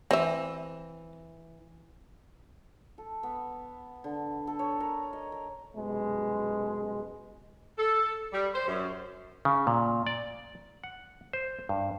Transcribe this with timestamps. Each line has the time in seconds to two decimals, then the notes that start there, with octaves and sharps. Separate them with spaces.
0.11 E3 C4 E5
2.98 A4
3.23 B3
4.04 D3
4.47 A4
4.59 C#5
4.80 A#4
5.13 D#5
5.32 A#4
5.76 C2 F#2 B2 G#3
7.78 A4
8.33 G3
8.54 C5
8.67 F#2
9.45 C#3
9.67 A#2
10.07 D5
10.84 F#5
11.33 C5
11.69 G2